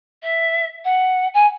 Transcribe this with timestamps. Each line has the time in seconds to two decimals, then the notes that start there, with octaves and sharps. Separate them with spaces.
0.22 E5
0.85 F#5
1.34 G#5